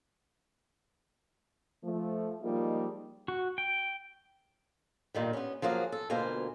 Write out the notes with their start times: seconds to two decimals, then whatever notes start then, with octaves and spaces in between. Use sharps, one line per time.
1.83 F3 A3
2.42 F3 G3 G#3 A#3 D#4 F4
3.28 F#4
3.58 G5
5.14 G2 A#2 D#3 G3
5.33 B3 C#4
5.62 F3 F#3 A#3 G#4
5.92 A4
6.10 D2 B2 A#3 F4 C5 G#5